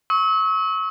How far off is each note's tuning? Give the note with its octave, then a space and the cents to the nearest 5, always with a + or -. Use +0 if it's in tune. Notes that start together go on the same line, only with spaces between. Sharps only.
C#6 -10 E6 -40